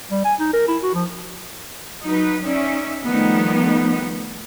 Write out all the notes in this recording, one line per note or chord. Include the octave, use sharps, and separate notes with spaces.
G3
G#5
D#4
A#4
E4
F#4
F3
F#3 D#4 B4
C#4 D#4 D5 E5
D#3 F3 G3 A3 B3 D#4